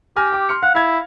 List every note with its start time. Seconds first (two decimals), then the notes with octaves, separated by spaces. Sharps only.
0.16 G4 G#5 F6 A#6
0.32 G5 D6
0.49 C6 F6 C#7
0.63 F5 F#5
0.75 E4 F5 G#6